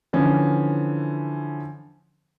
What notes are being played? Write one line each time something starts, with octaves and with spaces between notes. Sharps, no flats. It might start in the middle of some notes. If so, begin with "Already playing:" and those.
D3 E3 F3 C#4